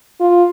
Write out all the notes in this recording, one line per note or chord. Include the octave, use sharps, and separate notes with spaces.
F4